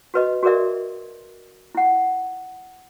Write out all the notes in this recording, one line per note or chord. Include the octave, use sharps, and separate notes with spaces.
F#4 B4 D#5
F#4 G#4 A#4 D5 E5
E4 F#5